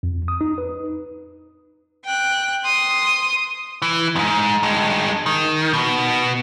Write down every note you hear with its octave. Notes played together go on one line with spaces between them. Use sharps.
F2
D#6
D#4
B4
G5 F#6
C6 D#6
E3
F2 G#2
G2 G#3
D#3
B2 B3